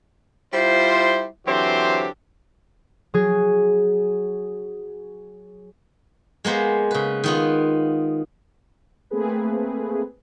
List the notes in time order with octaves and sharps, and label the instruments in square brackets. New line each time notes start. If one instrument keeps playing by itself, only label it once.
[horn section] G3 E4 F4 C5
D3 E3 F#3 C4 G4 C5
[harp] F#3 G#4
[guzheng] G#3 A#3 B3 C5
C#3 B4
D#3 B3 F4
[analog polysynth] A3 A#3 C4 G#4 B4